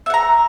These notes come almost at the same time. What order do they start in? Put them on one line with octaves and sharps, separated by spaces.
E5 F#5 A#5